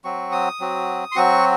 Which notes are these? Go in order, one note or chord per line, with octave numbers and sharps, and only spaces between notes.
F#3 C4 F#4 C#6
D#6
F#3 C4 F#4
C6
F#3 C4 F#4 C#6